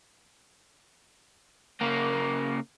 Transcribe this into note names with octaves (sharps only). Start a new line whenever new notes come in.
C#3 A#3